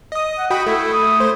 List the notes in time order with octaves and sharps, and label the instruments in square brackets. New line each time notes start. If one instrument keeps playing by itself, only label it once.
[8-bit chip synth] D#5 D#6
[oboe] F#5
[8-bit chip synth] F#4 G5 B5 [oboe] D#6
[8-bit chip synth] A3 [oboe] E4
[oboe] D#6
[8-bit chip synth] C5